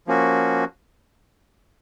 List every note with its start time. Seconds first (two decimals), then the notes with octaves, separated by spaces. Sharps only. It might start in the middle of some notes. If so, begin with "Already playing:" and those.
0.07 F3 A#3 C#4 F#4